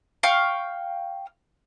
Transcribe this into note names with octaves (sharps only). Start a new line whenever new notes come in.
F5 G5 C#6